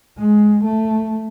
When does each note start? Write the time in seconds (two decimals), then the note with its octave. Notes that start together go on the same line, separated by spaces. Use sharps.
0.19 G#3
0.64 A3